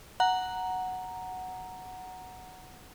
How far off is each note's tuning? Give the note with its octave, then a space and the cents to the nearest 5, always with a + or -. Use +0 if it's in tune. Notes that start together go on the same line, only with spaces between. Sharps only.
F#5 +0 A#5 +0